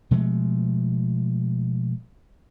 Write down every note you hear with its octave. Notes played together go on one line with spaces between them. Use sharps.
B2 F3 G#3 A3